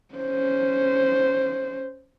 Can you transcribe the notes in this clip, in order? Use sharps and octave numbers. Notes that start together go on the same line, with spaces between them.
C#4 C5